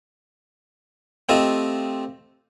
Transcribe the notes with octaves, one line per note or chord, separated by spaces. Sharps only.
A3 C4 F4 G4 D#5